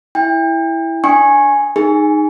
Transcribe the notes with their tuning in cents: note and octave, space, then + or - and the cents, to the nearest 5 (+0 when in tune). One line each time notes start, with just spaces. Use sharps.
E4 +0 G5 +35
D4 +0 G#5 +0 C#6 -20
D#4 -10 G#4 +0